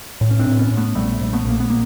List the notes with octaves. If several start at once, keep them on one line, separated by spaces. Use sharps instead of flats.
A2
C#4
C4 D4
A2
B3 C#4
A2
A3 B3
A#1 G3 A3
A#1
A3 B3
A#1 A#3
B3
A#3